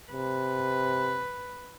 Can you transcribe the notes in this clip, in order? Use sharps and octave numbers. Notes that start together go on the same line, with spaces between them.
C3 B4